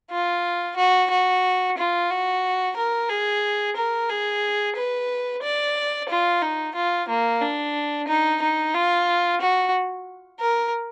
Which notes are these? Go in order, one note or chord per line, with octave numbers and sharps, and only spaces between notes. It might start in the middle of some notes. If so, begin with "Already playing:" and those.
F4
F#4
F#4
F4
F#4
A#4
G#4
A#4
G#4
B4
D5
F4
D#4
F4
A#3
D4
D#4
D#4
F4
F#4
A#4